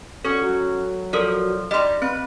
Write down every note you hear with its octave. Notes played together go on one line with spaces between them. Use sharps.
C#4 F#4 A4 C#6
F#3
F3 A4 A#4 D5
G3 D#4 D#5 C6
C4 B4